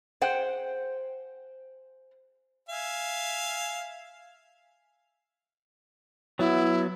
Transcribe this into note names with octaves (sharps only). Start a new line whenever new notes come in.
G#4 C5 F#5 G5
E5 F5 G#5
F#3 B3 E4